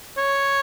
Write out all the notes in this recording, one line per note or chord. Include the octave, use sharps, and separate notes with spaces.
C#5